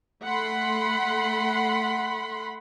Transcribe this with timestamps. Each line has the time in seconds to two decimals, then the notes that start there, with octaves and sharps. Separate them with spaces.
0.24 A3 F#5 B5 C6